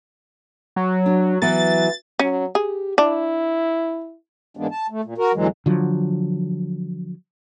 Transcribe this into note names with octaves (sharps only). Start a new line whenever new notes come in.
F#3
D4
E3 F#3 B3 A6
F#3 C#4
G4 G#4
D4 E4
G#2 E3 G#3 A#3 B3 D4
A5
A3
A#2
F#4 A#4
E2 D3 E3 F#3 G#3
D3 F3 F#3